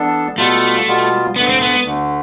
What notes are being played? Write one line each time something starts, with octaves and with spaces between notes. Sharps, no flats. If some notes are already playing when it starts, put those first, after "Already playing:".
Already playing: E3 B3 D4 A4
B2 G3 A3 B3 F4
B2 G3 B3 F4
D2 D3 A3 B3
C4
B3
D2 D3 A3